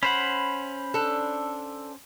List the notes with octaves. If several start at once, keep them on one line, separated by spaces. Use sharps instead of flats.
C#4 C5 F#5 B5
D4 A4